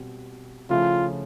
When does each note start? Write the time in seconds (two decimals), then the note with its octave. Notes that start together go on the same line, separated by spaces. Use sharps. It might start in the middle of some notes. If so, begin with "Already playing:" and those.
Already playing: B2 G3 C4
0.70 C#3 F3 A3 C#4 E4 F4